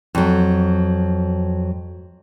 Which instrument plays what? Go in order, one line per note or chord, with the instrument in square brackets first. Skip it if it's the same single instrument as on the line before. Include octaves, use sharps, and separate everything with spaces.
[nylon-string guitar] F2 F#3